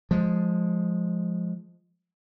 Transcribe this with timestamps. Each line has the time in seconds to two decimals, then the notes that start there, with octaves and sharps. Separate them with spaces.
0.11 F3 G#3